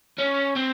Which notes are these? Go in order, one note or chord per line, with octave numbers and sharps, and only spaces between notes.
C#4
C4